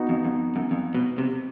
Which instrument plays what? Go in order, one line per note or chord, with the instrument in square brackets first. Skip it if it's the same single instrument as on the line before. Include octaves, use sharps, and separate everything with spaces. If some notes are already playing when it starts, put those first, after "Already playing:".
Already playing: [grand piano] B3 D#4 F#4
[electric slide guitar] F2
F2
F#2
F2
B2
C3